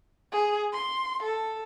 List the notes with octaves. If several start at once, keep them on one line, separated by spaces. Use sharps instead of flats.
G#4
C6
A4